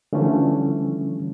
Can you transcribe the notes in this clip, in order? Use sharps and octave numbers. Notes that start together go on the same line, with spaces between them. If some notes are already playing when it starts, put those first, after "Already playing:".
D3 E3 F3 G3 A3 C#4